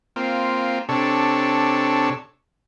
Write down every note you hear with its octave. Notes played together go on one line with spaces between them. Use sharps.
A#3 C4 F4
C3 D4 A4 C#5